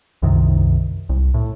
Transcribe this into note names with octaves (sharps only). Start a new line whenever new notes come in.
C2 F#2 C3 D#3
C2
A2